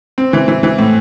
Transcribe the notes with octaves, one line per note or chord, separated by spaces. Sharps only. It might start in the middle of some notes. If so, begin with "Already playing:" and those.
C4
E3
E3
E3
A2